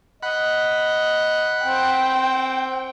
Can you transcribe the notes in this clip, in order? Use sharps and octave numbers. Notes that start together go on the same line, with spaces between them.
D#5 F#5 B5
C4 G5